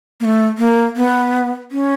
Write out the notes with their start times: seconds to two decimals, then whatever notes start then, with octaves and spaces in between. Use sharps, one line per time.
0.20 A#3
0.25 A3
0.58 A#3
0.96 B3
1.72 C#4